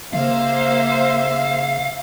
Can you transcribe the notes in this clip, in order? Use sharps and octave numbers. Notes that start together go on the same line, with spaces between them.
C#3 A#3 C5 E5 F5